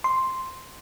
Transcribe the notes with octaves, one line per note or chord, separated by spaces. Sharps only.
C6